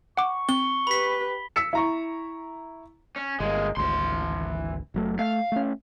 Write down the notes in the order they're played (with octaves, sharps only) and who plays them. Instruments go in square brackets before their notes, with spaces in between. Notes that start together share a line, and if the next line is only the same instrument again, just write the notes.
[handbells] F#5 D6 [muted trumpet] C#6
[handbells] C4 [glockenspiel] G7
[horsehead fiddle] G4 B4 [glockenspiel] B5 B6
[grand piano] E6 B6 C#7 E7
E4 A#5 C#6
[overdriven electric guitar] C#4
[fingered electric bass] G1 [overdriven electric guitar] G#3 A#3
[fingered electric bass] G#1 D2 [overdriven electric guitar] E3 C6
[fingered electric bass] F#1 F#3 A3
[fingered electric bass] A3 [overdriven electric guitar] F5
[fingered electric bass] A3 C#4